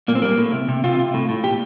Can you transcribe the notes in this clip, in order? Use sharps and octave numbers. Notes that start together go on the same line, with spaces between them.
A#2 A#3
C4
G3 A#3
A2
C3
C3
C3 F4
C3
A2
A2
A#2 G4